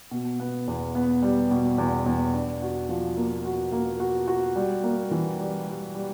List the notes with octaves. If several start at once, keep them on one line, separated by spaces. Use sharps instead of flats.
B2
B3
E2
B3
G3
B2
E2
E2
D4
F#4
F3
A#3
F#4
A#3
F#4
F#4
G3
A#3
E3
G3
G3
G3